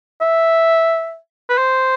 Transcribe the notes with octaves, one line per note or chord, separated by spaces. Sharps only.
E5
B4
C5